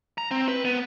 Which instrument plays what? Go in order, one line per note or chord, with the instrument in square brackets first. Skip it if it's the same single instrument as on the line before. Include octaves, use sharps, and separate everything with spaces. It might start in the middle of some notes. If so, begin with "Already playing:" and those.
[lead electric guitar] A#5
C4
B4
B3